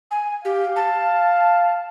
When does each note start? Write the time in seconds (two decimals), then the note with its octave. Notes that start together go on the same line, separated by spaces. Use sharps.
0.11 G#5
0.45 G4 F5
0.76 A5